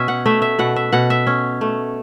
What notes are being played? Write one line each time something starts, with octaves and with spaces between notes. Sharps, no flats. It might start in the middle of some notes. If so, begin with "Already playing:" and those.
Already playing: B2 C#4 E5
F#5
A3 E5
E5
B2 F#5
E5
B2 F#5
E5
C#4
A3